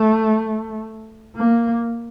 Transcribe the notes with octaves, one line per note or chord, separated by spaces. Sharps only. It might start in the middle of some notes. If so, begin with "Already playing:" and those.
Already playing: A3
A#3